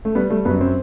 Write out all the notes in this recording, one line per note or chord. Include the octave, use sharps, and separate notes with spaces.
A3
G3 B3
G3 A3
F#2 B3
C4